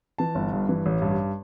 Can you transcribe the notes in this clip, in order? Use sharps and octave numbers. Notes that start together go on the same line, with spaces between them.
E3 A5
G1
G2
E3
A1
G2